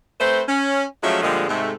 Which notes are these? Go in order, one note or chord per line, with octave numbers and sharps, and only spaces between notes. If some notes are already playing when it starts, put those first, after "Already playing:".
A3 C4 B4 C5
C#4
F3 F#3 G#3 A3 C#4 E5
A#2 D3 F3 G3 G#3
G#2 C3 G#3 A3